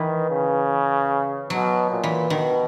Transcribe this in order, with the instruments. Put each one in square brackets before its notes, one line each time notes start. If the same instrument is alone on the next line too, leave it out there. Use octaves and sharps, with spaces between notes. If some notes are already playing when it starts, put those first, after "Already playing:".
Already playing: [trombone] D#3 [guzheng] E3
[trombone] C#3
[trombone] B2 [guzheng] F#3
[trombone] A#2
[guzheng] E3
[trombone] B2 [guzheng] D#3